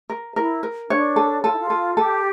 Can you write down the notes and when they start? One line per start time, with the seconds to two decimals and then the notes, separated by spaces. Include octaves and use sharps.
0.10 A#4
0.36 E4 A#4
0.63 A#4
0.89 D4 C#5
1.16 A4
1.43 F4 A4
1.52 E4
1.59 F4
1.70 A4
1.97 G4 A4